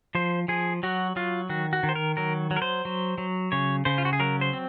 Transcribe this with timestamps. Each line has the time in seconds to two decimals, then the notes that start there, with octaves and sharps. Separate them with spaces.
0.15 F3 C5
0.48 F3 G#4
0.83 F#3 F#4
1.16 F#3 F4
1.49 D#3 F#4
1.73 F#4
1.83 D#3
1.89 C5
1.95 A#4
2.17 F#3 A#4
2.51 F#3
2.56 A#4
2.62 C5
2.85 F#3
3.18 F#3
3.52 C#3 C#5
3.85 C#3 C5
3.98 F4
4.05 F#4
4.13 G#4
4.19 F#3 A#4
4.41 C5
4.53 C4